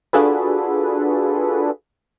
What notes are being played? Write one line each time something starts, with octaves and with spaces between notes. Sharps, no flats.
D4 F4 F#4 G#4 A4 B4